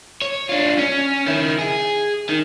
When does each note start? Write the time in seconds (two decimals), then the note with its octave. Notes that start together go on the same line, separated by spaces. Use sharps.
0.22 C#5
0.49 D4 F4
0.78 C#4
1.27 D#3 E4
1.59 G#4
2.29 D#3